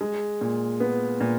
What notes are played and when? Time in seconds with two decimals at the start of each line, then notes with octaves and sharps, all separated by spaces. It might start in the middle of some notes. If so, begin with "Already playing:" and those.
0.01 G#3
0.41 A#2
0.80 B3
1.20 A#2